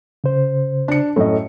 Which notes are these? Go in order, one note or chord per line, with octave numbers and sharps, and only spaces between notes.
C#3 C5
D4 C#7
F#2 A2 A4 D#5